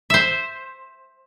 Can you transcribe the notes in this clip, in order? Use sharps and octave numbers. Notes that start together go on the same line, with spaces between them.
C5 E5